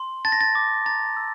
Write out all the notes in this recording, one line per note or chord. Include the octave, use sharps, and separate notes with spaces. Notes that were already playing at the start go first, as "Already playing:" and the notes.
Already playing: C6
A5 A6
A#6
A6
D6
A#5 A6
E6